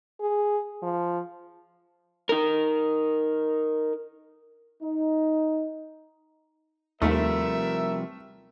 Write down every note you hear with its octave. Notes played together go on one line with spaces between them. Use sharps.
G#4
F3
D#4 A#4
D#4
D#2 C3 F3 G3 A3 A#4 E5